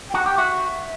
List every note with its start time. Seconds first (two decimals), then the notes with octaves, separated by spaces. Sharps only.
0.10 G5
0.13 F#4 F#5
0.26 G4
0.36 F#4 E5